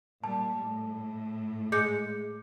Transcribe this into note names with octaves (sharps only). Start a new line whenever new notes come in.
A#2 G3 A5
A2
G#3 D6 G6 C#7